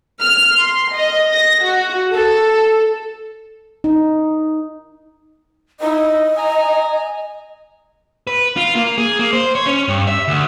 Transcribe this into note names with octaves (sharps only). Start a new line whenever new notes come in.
F6
C6
D#5
A#6
F#4
A4
D#4
D#4 E4 D#5
G#5 A#5
B4
F4
A#3
G#4
A#3
C5
C#5
C#4
G2
E5
D2